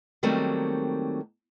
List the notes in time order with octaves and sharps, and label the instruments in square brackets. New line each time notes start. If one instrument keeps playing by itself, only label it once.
[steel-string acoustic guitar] D#3 F#3 G3 A3 A#3 C4